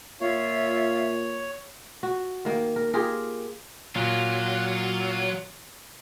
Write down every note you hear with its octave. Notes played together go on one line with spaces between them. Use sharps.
A#2 F4 C#5 E5 F5
F#4
D#3 A#3
A#4
F4 G4 G#4 A#4
A#2 F#3 F4